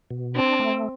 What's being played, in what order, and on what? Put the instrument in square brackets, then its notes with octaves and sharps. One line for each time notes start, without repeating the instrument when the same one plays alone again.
[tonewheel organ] B2
[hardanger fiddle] C4 [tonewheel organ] D4
[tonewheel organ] A3